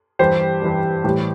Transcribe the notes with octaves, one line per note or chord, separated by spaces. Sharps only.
G2 E3 G3 G4 C5
G2 E3 G3
A2 E3 G3 G4